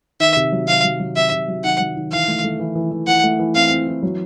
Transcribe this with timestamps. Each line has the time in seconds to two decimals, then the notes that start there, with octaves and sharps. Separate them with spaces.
0.20 D#3 E5
0.37 C3
0.52 F#3
0.68 C3 F5
0.84 F#3
1.00 F#3
1.16 C3 E5
1.32 C3
1.48 F#3
1.64 D#3 F#5
1.80 F#3
1.96 D#3
2.12 E3 F5
2.28 A3
2.44 A3
2.60 E3
2.75 E3
2.91 E3
3.07 E3 F#5
3.23 A3
3.39 E3
3.55 C4 F5
3.71 C4
3.88 E3
4.03 F#3